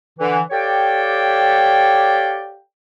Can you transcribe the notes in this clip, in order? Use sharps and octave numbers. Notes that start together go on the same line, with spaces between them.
D3 E3
G4 A4 C#5 D5 F5 G5